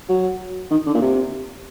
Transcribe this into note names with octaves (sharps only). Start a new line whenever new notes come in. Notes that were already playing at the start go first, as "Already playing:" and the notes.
F#3
D#3
D3
A#2
C3